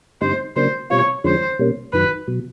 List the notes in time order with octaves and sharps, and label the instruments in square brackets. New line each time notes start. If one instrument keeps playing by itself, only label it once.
[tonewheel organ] G2 D3 G3 C4 D#4 [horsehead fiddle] C5
[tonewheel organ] C#3 F#3 A#3 D4 [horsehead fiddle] C5
[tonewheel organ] B2 G3 C4 F4 [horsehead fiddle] C#5
[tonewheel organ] F2 D3 F3 G#3 C#4 [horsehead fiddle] C5
[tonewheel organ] B2 G3 A#3 C#4
[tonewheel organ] F#2 D#3 F#3 [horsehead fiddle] B4
[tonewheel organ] B2 F#3